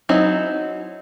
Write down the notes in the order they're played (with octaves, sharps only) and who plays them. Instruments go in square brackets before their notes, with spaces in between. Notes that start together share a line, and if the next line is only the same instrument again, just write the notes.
[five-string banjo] F#3 C4 C#4 D#4 E4